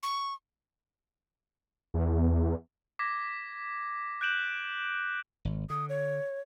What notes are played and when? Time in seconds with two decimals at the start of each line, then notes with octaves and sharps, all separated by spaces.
0.03 C#6
1.94 E2
2.99 D6 G#6 A#6 B6
4.21 F#6 G6 D7 E7 F#7
5.45 G#1
5.70 D3 D#6
5.89 C#5